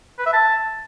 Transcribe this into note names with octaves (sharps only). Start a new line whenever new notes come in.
B4
E5
A5